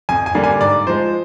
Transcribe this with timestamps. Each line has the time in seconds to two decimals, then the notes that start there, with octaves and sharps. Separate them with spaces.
0.09 F2 G#5
0.26 G#5
0.35 D3 G3 A#3
0.44 G#5
0.61 G#2 D5
0.87 F3 G#3 C5